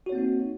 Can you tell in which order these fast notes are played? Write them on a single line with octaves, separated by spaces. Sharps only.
F#4 C#5 C4 A#3 D#4